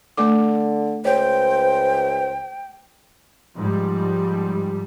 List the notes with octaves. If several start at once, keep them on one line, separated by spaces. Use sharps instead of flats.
D3 A3 D6
C#2 C5 C#5 G5
G#2 F3 G3